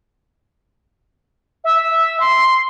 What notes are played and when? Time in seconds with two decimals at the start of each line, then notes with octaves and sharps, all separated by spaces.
1.64 E5
2.20 C6